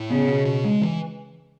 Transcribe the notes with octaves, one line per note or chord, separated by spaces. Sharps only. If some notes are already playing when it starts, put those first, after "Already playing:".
Already playing: A2
C#3 B3
B2
B2
G#3
E3